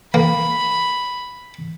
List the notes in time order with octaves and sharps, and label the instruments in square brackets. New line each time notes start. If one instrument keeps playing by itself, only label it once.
[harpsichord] A#3 [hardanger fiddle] B5